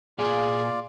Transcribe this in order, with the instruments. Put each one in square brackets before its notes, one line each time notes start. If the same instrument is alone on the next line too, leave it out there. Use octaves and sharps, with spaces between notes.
[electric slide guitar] A#2 F5 G#5 [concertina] F4 D5 [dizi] G#4